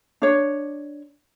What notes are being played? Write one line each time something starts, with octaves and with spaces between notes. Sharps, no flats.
D4 C#5